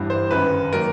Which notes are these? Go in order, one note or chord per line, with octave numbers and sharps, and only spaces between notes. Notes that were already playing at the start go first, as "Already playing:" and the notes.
Already playing: G1 G2 E3
C5
F#1 F#2 D#3 B4
D#3 F#3 A#3 A#4